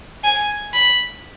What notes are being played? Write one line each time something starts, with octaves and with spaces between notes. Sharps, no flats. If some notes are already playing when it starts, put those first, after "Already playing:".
G#5
B5